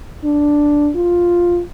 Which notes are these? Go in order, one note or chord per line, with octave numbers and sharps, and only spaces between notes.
D4
F4